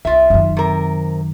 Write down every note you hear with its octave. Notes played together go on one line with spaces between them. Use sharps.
C2 F4 E5
F#2 D#3
C3 A#4